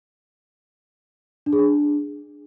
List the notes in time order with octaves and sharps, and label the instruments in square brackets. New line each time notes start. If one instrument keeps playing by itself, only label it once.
[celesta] D4
G#4
D4